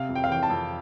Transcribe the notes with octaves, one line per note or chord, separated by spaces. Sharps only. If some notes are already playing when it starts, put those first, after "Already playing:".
Already playing: C3 F5
F2
G5
F5
E3 G5
A5
F2